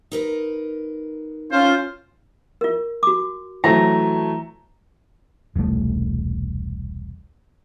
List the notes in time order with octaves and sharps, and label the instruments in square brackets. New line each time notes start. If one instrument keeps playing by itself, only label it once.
[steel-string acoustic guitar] D#4 A#4 B4
[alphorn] C#4 [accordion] F4 [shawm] C5
[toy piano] F4 A#4
F#4 D6
[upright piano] E3 F#3 A3 [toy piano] C5 C#5 G5 [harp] A#5
[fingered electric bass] E1 C2 G3 A3